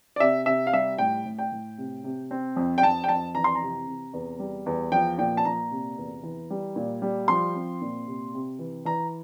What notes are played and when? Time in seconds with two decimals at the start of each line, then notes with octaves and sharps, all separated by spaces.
0.16 D5
0.20 C3 E5
0.46 C3 E5
0.67 F5
0.73 G3 E5
0.98 A2 G5
1.25 A2
1.39 G5
1.52 A2
1.78 C3
2.04 C3
2.31 C4
2.56 F2
2.78 G5
2.83 F2 A5
3.04 G5
3.08 F2 A5
3.35 E3 A#5
3.44 C6
3.55 A#5
3.62 C3
3.87 C3
4.13 E2
4.39 G3
4.66 E2
4.92 F3 G5
5.18 A#2 G5
5.37 A5
5.45 A#2 A#5
5.71 C3
5.97 E2
6.23 E3
6.50 G3
6.76 A#2
7.02 G3
7.28 F3 C6
7.55 C4
7.82 A#2
8.07 C3
8.34 C3
8.59 E3
8.85 E3 A#5